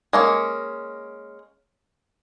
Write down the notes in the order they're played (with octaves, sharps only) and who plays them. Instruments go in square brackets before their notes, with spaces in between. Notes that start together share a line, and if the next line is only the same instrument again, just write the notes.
[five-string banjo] G#3 A#3 C#4